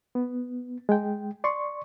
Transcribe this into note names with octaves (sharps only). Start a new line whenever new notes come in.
B3
G#3 G5
D5 C6 C#6